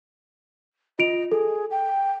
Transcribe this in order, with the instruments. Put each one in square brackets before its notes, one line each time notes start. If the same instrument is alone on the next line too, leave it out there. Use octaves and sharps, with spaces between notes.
[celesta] F4 D7 F7 [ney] D#5
[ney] G#4 [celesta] A4
[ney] G5